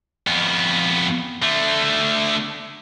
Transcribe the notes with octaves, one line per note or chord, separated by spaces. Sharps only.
F2 B3
D3 A3